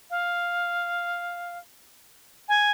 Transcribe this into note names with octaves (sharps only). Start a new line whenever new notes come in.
F5
G#5